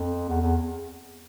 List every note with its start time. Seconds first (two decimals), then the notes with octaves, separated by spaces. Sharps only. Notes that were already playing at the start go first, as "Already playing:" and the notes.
Already playing: F2
0.29 E2
0.42 E2